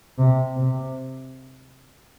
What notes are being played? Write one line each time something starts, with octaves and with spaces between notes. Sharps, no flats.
C3
C3